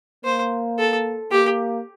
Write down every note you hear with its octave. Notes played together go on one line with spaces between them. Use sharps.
A#3 C5
A4
A#3 G4